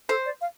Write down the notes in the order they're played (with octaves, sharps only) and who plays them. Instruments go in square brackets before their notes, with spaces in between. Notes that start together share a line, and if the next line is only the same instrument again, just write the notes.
[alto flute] A4 [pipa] C5
[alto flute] D5
F5